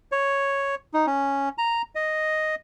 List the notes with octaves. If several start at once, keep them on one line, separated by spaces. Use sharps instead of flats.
C#5
D#4
C#4
A#5
D#5